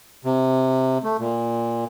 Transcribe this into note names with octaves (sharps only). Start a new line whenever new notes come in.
C3
A3
A#2